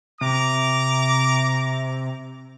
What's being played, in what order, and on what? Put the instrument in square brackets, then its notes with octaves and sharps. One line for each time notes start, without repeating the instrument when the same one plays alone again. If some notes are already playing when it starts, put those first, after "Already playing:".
[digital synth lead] C3 [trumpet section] A#5 D6